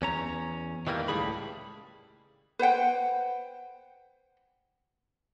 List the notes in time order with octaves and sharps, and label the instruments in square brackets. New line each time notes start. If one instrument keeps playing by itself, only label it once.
[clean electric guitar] E2 C#4 A#5
D#3 E3 G3 A#3
C#2 A2 G3 G#4 B5
[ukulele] B4 C5 F#5 G5